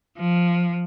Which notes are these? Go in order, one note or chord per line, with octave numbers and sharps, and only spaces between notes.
F3